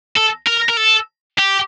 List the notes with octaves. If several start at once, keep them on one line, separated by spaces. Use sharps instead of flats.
A4
A#4
A#4
A4
G4